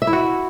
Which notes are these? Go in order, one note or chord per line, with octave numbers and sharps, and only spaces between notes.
E5
E4
F#4